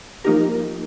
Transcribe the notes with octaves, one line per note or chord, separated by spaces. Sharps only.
F3 A#3 D#4 G4 A#4